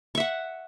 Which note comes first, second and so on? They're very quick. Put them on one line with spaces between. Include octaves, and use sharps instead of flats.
C#6 E5 F#5